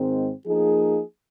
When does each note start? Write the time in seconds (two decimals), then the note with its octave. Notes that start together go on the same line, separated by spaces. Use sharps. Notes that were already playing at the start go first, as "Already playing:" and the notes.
Already playing: G#2 D#3 G#3 C4
0.46 F3 A#3 D#4 G#4